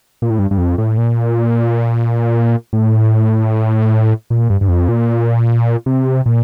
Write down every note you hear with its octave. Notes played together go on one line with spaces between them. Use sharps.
A#2
A2
G2
G2
F2
A2
A#2
A2
A#2
G2
G2
F2
A#2
C3
A#2